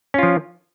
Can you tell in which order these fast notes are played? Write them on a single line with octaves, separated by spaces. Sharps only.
C#4 F4 F3